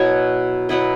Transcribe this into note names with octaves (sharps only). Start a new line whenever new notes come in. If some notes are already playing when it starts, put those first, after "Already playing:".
Already playing: B2 F#3 B3 E4 C#5
B2 F#3 B3 E4 B4